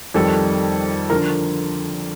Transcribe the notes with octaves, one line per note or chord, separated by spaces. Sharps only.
F2 D#3 G3 A4
D3 F3 A#4